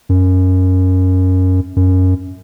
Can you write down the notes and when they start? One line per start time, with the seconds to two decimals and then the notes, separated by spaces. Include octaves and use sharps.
0.09 F#2
1.76 F#2